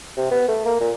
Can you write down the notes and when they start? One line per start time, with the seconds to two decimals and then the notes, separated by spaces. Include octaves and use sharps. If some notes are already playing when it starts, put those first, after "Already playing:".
0.17 C3
0.31 B3
0.48 A3
0.66 A#3
0.81 A#2